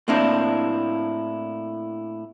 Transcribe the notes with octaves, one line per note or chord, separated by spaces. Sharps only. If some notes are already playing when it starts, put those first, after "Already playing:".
A2 A#3 C4 D4 E4